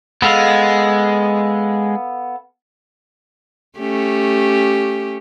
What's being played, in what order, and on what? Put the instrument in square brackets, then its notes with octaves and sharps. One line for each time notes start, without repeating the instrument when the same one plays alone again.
[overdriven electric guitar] G#3 [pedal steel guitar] B3 A4 F5
[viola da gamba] A3 C#4 G4